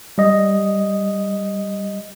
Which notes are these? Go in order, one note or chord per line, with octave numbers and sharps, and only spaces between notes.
G3 D#5